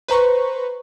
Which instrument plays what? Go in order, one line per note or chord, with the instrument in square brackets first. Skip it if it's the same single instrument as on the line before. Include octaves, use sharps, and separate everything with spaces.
[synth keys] B4 C5 A#5 C#6